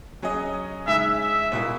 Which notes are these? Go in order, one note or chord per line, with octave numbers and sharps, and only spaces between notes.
F#3 C#4 G#4 D#5
C#3 G#3 D#4 E5
E5
C#2 B2 A#3 E4